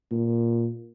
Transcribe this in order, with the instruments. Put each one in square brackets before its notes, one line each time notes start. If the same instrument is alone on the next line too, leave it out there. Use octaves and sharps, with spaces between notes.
[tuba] A#2